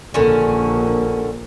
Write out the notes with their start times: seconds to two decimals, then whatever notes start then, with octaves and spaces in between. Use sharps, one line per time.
0.14 A#1 D3 D#3 C#4